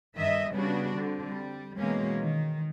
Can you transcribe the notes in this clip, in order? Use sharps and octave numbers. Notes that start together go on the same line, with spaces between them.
G2 D#3 D#5 E5
C#3 G3 B3 D4 F#4
D3 C4
G3
B2 E3 G#3 A#3 C#4
D#3